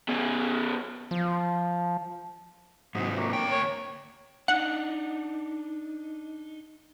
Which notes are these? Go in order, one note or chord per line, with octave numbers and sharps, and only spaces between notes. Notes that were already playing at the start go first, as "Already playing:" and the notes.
B2 C#4
F3
G#2 C3 F#3 D#4
A#3 D4 C#5
D2 G5
A#3 C#5
D4 D#4 F#5